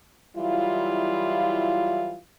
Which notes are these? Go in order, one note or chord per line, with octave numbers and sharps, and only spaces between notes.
E3 F#3 G3 E4 F4